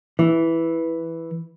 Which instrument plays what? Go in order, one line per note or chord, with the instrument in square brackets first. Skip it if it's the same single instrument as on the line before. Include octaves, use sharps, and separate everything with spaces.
[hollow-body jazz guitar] E3